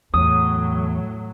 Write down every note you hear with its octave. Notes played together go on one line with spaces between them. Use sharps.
E2 A2 F#3 D#6